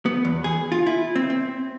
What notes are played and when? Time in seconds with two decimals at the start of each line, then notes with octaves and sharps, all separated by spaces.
0.06 B3
0.25 E2
0.44 G#4
0.72 F4
0.86 E4
1.16 C4
1.30 C4